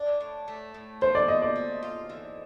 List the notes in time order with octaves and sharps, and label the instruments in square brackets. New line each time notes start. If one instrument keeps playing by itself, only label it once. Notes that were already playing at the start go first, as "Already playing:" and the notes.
Already playing: [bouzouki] D4
A2
A3
A2
[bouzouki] F3 [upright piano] C5
[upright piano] D5
[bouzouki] F3 [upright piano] D#5
[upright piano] D5
[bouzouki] A3
F4
E3